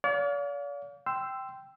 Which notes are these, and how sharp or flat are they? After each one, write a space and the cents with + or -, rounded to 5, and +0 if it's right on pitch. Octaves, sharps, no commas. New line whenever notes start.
D5 -45 F5 +20
G5 -5 C6 -10 E6 +10